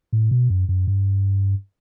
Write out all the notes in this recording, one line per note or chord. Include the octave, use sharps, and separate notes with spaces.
A2
B2
F#2
F#2
G2